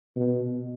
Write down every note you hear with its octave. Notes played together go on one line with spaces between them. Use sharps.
B2